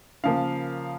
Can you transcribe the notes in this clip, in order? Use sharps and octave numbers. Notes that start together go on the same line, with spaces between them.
C#3 F3 A#3 F5